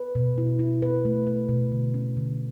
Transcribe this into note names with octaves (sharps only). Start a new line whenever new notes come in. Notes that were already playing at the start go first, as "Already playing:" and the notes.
Already playing: B4
B2
E4
E4
B4
A3
B4
B2
D3
C#4
D3